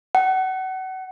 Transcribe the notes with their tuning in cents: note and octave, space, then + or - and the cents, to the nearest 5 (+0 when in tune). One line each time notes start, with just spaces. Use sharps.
F#5 +30